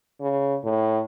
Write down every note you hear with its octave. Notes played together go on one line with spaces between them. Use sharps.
C#3
A2